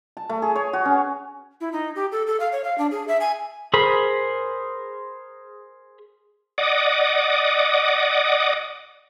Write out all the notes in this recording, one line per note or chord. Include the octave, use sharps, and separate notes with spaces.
A5
A3
G#4
C#5
F#4
C#4
E4
D#4
G4
A4
A4
F5
C#5
F5
D4
G#4
E5
G#5
G#4 A#4 C5 B5
D5 D#5 F#5 D6 D#6